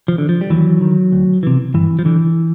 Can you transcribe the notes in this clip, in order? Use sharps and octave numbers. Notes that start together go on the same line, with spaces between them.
F3
D3
F3
G3
D#2 E3 F#3
D#3
D2
C3 E3
G2 E3
F3
D3 E3